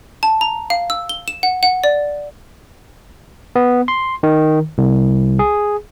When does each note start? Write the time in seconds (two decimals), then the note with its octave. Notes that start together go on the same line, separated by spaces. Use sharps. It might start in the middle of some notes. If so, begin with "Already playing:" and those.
0.23 A5
0.41 A#5
0.70 F5
0.90 E6
1.09 G7
1.28 E7
1.43 F#5
1.63 F#5
1.84 D5
3.56 B3
3.88 C6
4.23 D#3
4.78 C2
5.39 G#4